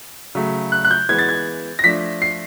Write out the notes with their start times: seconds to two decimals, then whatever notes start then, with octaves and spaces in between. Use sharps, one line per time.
0.35 C#3 F#3 A3
0.72 F#6
0.85 F#6
0.91 G6
1.09 E3 G#3 B3 G#6
1.19 A6
1.29 G#6
1.79 A#6
1.84 F3 A3 D4 B6
2.22 C7